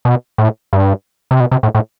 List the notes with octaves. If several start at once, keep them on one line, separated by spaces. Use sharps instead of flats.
B2
A2
G2
C3
B2
C3
A2
A2